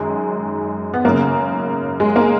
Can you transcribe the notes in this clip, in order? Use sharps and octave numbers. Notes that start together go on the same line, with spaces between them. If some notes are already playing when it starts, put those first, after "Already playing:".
Already playing: F#2 D#3 G#3
B3
F#2 C#3 A#3
G#3
A#3